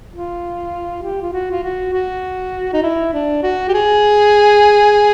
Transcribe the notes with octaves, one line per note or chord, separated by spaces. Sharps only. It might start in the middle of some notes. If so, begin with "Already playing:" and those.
F4
G4
F4
F#4
F4
F#4
F#4
D#4
E4
D4
F#4
G4
G#4